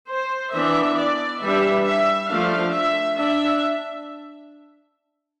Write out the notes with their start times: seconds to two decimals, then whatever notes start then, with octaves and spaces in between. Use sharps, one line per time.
0.08 C5
0.52 E3 B3 D4 E5
0.97 D5
1.40 E3 G3 D4 E5
1.85 E5
2.29 F3 A3 D4 F5
2.73 E5
3.17 D4 E5